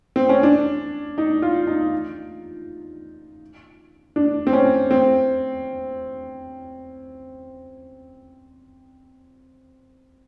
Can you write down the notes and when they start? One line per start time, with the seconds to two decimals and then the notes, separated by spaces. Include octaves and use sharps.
0.16 C4
0.29 C#4
0.43 D4
1.18 D#4
1.42 F4
1.67 D#4
4.16 D4
4.47 C4
4.53 C#4
4.91 C4